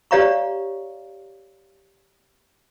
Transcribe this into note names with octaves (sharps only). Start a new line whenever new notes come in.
G4 C#5 D5 F5 A#5 C#6